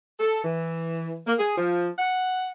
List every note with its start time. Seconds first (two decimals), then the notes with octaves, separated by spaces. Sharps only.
0.19 A4
0.44 E3
1.27 A#3
1.39 G#4
1.58 F3
1.98 F#5